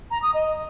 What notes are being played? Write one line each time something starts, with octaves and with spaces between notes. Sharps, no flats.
A#5
D#6
D#5